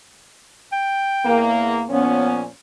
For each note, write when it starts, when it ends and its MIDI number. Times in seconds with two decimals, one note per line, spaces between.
0.72 1.45 79
1.25 1.84 40
1.25 1.84 58
1.89 2.46 46
1.89 2.46 53
1.89 2.41 59
1.89 2.46 61